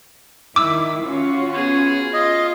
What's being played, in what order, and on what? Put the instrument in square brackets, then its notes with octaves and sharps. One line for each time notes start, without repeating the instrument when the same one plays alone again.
[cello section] D#3 E4 [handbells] D6 E6
[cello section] C#4 F4 F#4
[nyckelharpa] B3 G#4
[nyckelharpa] F4 [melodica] D#5